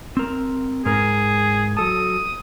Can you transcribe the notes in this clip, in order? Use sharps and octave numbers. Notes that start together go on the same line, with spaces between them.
C4 A#4
G#2 G#4 A#4
F#3 A4 A5 D#6